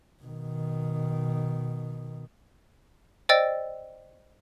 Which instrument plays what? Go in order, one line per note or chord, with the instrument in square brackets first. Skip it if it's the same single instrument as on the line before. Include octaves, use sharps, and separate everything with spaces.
[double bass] B2 D#3
[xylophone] C5 D5 D#5 G5 E6 A6